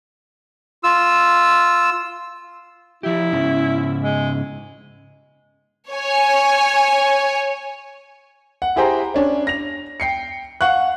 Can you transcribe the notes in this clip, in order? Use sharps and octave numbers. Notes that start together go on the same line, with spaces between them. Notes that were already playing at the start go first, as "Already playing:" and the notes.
F4 E6
F3 E4 G4
G#2 C#3 C#4
G#3
C#5 G#5
F#5
E4 G4 G#4 C5 G5 A#5
C#4 D4 C#5
A#6 F7
G5 C7 C#7
F5 F#5 C#6 F#6